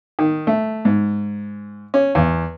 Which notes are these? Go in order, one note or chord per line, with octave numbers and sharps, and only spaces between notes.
D#3
A3
G#2
C#4
E2